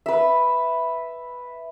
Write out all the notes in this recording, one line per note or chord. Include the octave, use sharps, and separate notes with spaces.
B4 E5